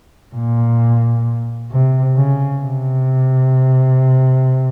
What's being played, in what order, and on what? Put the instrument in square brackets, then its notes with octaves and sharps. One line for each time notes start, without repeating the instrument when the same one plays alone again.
[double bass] A#2
C3
C#3
C3